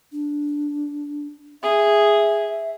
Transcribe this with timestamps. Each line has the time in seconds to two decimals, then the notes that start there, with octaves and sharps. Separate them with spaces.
0.12 D4
1.63 G#4 E5